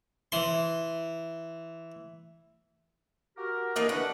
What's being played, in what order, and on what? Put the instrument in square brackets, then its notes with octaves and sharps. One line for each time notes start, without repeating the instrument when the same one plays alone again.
[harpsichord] E3 C6
[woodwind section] F#4 G4 A#4
[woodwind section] E3 D4 [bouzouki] A#3 D#4 D#5
[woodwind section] D4 B4 C#6 [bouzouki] F#5